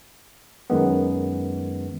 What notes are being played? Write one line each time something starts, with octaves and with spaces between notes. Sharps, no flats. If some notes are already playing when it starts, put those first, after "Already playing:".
F#2 D#3 G#3 B3